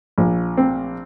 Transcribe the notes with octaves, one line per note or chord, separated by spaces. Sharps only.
A#1
C4